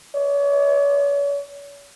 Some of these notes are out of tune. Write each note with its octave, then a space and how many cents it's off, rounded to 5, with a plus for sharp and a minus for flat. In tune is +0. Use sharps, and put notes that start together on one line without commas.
C#5 +40